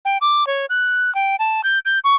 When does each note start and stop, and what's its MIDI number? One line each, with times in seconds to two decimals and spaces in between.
0.05 0.18 79
0.21 0.46 86
0.47 0.66 73
0.69 1.13 90
1.15 1.36 79
1.39 1.61 81
1.64 1.79 91
1.85 1.99 91
2.04 2.16 85